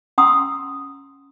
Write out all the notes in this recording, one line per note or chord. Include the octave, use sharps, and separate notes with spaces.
C#4 F#5 A#5 C6 D#6 E6